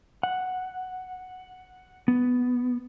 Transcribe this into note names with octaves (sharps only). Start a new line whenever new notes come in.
F#5
B3